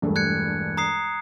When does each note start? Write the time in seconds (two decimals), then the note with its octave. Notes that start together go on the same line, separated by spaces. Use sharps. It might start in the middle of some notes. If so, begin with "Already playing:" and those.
0.02 E1 G2 A3
0.16 F#6 G#6 C#7
0.77 A#5 D#6 C7